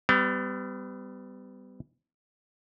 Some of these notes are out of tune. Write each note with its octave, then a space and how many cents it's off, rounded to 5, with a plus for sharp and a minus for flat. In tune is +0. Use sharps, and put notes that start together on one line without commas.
G3 +0 B3 +40